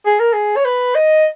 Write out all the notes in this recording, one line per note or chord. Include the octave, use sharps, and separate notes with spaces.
G#4
A#4
G#4
C#5
B4
D#5